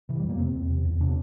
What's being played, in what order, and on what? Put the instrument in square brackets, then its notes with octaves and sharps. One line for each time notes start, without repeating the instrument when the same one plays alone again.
[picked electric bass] C3 E3
G3
F2
A#3
C3 C4
E2
C3
E2
C3 D4